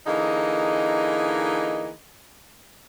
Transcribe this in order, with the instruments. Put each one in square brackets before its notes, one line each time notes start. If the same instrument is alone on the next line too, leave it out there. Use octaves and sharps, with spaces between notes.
[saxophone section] D3 E3 A#3 D#4 G#4 D#5